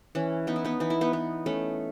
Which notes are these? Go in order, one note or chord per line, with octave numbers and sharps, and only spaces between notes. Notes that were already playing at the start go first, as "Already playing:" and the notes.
E3 C#4
B3 D#4
E4
B3 D#4
E3 D#4
E4
B3 D#4
B3
A3 C#4